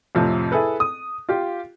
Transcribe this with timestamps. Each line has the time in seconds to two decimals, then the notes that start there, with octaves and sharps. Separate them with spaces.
0.15 F2 A2 C3 F3
0.52 E4 G#4 A4 B4
0.80 D#6
1.29 F4 G4